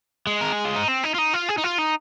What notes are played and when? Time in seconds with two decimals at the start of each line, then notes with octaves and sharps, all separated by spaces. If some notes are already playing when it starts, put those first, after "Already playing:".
0.27 G#3
0.41 A#4
0.52 G#4
0.65 F4
0.76 D#4
0.88 C4
1.03 D#4
1.14 F4
1.18 D#4
1.34 F4
1.49 G#4
1.58 D#4
1.64 F4
1.78 D#4